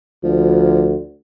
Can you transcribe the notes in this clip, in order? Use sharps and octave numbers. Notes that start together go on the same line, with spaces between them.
D2 F3